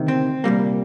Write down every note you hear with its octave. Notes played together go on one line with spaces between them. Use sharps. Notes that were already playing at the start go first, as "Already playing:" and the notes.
Already playing: D2 C3 D#3
C4
C2 A#2 G3 A#3